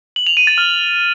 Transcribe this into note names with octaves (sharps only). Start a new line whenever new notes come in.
F#7
F7
D#7
A6
F6